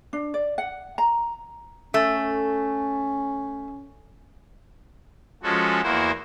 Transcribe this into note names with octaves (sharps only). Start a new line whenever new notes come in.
D4
D5
F#5
A#5
A3 C#4
F3 G#3 C#4 F#4 A4
E2 A#3 E4 F#4 C5